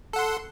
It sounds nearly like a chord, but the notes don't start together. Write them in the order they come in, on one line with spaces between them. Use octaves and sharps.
A4 F#5 C6